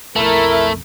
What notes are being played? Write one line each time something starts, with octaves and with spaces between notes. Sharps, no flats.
B1 F2 A3 E4 A#4